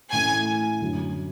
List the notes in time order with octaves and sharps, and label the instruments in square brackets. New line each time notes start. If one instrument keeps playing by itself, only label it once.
[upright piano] A2 E3 A3 C#4 E4 [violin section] G#5
[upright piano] F#2 D3 F#3